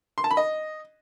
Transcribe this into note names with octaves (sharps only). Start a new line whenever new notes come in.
C6
A5
B5
D#5